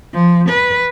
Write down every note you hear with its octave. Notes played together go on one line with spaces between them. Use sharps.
F3
B4